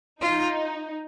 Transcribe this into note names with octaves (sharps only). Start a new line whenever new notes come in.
D#4 F4